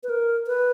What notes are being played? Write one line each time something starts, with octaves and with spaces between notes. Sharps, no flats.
B4
A#4
B4